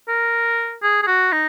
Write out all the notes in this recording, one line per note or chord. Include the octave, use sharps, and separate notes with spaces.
A#4
G#4
G#4
F#4
D#4